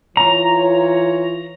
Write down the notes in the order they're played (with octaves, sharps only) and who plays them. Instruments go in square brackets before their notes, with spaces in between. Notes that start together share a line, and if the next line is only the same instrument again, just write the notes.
[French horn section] E3 F4 C#5 [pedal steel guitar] A#5